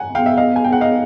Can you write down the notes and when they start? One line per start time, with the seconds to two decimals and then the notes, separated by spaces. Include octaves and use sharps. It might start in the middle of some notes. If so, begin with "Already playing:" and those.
Already playing: F#5 G#5
0.09 C4
0.14 B3 F5 G5
0.26 E5
0.37 D#5 F5
0.56 G#5
0.65 G5
0.73 F#5
0.81 D#5 F5